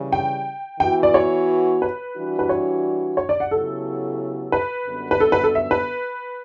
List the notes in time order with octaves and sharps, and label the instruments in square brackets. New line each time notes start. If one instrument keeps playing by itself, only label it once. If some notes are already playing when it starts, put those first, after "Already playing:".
Already playing: [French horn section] C#3 E3 G3
[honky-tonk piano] G5
[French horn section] E3 B3 F#4 [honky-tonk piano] G5
[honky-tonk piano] D5
C#5
B4
[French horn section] E3 G3 D4 F#4
[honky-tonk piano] B4
C#5
C#5
D5
F#5
[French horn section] C#3 F#3 B3 E4 G4 [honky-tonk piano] A4
[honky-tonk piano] B4
[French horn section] F#2 D3 G3 B3
[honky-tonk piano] B4
A4
B4
A4
E5
B4